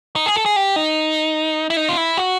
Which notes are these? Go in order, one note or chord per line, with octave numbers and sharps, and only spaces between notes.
D#4
G#4
A4
G#4
G4
D#4
E4
D#4
F4
E4
F#4